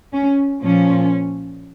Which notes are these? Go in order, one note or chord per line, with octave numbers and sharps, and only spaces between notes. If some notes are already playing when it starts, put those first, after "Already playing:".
C#4
A#2 F3 C#4